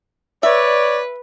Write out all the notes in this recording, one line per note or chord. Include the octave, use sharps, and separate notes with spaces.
B4 C#5 D5 E5